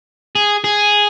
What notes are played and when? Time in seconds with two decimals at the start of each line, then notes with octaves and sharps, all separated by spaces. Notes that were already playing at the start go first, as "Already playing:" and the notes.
0.35 G#4
0.64 G#4